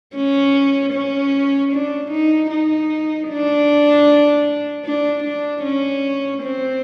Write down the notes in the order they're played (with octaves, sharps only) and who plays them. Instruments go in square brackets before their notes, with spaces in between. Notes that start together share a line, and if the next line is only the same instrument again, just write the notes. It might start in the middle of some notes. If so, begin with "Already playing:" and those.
[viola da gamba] C#4
C#4
D4
D#4
D#4
D4
D4
D4
C#4
C4